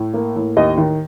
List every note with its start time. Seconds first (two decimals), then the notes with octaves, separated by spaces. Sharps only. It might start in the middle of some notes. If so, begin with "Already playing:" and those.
Already playing: A2
0.14 A#3
0.36 A2
0.57 D#2 D#5
0.78 D#3